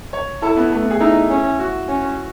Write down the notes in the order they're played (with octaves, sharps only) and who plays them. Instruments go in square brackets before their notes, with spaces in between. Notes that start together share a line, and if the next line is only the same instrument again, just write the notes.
[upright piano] C#5
[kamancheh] E4 [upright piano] A4
[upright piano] B3
A3
B3
G#4
[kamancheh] D#4 [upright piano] E4
[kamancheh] C#4
[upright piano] F#4
[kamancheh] C#4